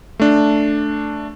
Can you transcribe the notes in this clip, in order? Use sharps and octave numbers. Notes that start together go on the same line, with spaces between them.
A3 D4